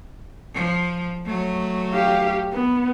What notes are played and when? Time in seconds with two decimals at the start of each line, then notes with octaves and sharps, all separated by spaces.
0.54 F3
1.26 F#3 A3
1.94 G4 F5
2.53 B3